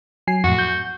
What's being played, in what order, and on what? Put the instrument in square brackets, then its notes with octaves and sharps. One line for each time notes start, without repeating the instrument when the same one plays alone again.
[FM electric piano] F#3 G#5 C7
[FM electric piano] F2 A2 [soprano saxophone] F#4
[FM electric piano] G6